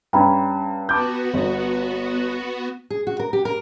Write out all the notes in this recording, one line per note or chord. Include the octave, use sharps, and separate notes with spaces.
G2 C#4 G5 A#5 B5
B3 F#4 A5 D6 G6
G1
G#4
F#4
A#4
G4
A#4